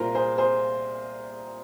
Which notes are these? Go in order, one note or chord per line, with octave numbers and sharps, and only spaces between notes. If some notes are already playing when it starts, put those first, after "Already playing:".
Already playing: C2 A#2 F4 G#4 A#4 C5
G#4 C5
G#4 C5